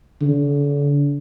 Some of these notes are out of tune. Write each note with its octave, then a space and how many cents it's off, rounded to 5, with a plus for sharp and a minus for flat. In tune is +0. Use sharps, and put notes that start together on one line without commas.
D3 -40